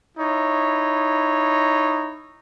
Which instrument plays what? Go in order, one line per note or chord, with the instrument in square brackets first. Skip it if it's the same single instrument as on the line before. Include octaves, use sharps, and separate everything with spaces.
[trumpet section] D#4 E4 C#5